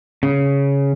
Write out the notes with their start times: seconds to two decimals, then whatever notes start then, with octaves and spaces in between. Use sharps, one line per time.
0.23 C#3